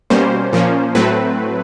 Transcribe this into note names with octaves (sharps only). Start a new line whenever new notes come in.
B2 G3 A#3 C#4 C5
A#2 F3 A#3 C#4
A2 F#3 A3 C4 B4